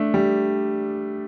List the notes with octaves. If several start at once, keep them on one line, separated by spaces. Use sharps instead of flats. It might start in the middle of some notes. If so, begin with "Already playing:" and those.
Already playing: A3 D4
G3